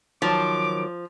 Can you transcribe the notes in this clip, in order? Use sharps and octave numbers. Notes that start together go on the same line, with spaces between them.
D#3 F3 F#3 D6